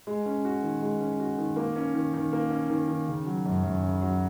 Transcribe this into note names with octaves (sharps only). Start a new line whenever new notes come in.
G#3
C#4
F#4
D#3
G#3
C#4
F#4
D#3
A#3
C#4
D#3
D#3
A#3
C#4
D#3
D#3
C#3
F#3
F#2
F#2
C#3
F#3